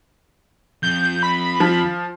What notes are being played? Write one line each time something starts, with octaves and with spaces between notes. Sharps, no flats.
F2 G6
B5
F3